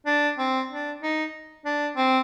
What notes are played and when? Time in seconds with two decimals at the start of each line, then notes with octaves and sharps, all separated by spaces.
0.06 D4
0.39 C4
0.71 D4
1.02 D#4
1.65 D4
1.97 C4